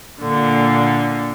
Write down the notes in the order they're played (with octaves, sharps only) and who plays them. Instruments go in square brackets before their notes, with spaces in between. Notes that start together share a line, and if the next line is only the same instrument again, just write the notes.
[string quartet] A#2 D3